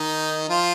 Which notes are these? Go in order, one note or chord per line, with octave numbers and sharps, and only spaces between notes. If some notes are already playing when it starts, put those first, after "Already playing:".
Already playing: D#3 D#4
F3 F4